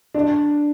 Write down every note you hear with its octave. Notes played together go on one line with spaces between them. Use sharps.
D4